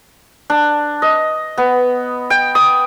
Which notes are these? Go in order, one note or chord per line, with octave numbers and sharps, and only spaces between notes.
D4
D#5
B3
G5
D#6